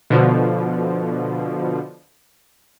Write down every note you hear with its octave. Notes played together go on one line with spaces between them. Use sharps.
B2 D3 F3